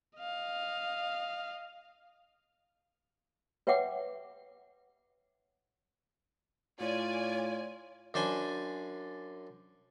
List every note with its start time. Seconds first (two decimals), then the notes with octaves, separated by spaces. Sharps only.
0.19 D#5 F5
3.67 B4 C#5 E5 F#5 G5 D6
6.80 A2 F4 C#5 D5 G#5
8.14 F#2 D4 C5 G#5 B5 C6